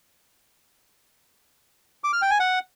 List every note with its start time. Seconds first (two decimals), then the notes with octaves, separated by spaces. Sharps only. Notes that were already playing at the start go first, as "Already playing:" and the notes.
2.04 D6
2.13 F6
2.22 G5
2.31 G#5
2.40 F#5